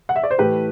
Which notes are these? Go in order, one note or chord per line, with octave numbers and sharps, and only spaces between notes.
F#5
E5
D5
C5
A2 E3 A3 G4 B4